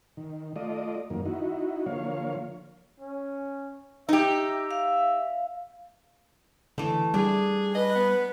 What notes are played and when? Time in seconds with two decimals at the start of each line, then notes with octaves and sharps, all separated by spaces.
0.17 D#3
0.56 A3 F4 D5 D#5
1.10 F#2 D#3 A#3
1.26 D#4 E4 F#4
1.86 D3 F3 A#3 C#5 F5
3.00 C#4
4.09 D#4 G4 E5
4.71 F5
6.78 D3 E3 A3
7.14 G3 D4 G#4
7.75 B4 D#5
7.95 B3